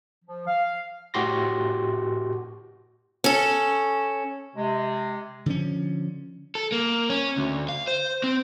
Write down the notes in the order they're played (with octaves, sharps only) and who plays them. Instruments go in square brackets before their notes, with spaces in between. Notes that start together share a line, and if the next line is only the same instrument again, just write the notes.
[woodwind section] F3
F5
[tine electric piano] A2 F#4 G4 C6 A#6
[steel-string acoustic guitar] C#4 A4
[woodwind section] C3 G#3
[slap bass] D3 F3 C#4
[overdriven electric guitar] A4
A#3
C#4
D2
F5
C5
C4